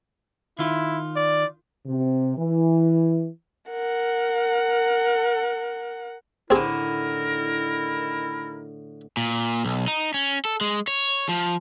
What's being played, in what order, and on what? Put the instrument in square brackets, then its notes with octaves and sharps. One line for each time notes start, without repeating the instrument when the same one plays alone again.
[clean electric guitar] D#3 F4 [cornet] E4
[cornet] D5
[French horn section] C3
E3
[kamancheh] A#4 F#5
[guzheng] A2 D3 [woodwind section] D#3 E4 [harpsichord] C4 G#4 [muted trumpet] A#4
[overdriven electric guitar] A#2
B1
D#4
C#4
A4
G#3
C#5
F3